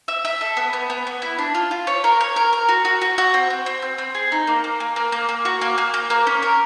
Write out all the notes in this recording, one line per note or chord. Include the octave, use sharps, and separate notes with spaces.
E5
E5
A4
B3
B3
B3
B3
E4
D4
F4
F4
C#5
A#4
C#5
A#4
A#4
F#4
F#4
F#4
F#4
C4
C4
C4
C4
C4
G#4
D#4
A#3
A#3
A#3
A#3
A#3
A#3
F#4
A#3
A#3
A#3
A#3
C#4
A#4